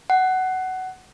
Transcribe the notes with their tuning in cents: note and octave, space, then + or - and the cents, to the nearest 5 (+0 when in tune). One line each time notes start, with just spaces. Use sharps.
F#5 +15